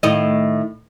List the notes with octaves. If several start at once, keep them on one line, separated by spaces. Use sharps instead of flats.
A2 D#3 D#5